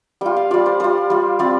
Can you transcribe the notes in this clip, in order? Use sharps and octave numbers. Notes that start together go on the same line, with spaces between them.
G3 F4 G5
F5
G3 F4 D5
C5
G3 F4 C5
G3 F4
G3 C4 F4 D5